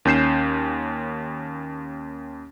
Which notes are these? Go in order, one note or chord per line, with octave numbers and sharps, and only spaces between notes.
D#2 C#4 G6 C7 E7